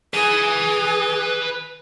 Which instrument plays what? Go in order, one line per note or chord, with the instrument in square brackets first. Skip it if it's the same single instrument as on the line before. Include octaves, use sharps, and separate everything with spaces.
[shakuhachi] G#4 [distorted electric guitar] B4 G#5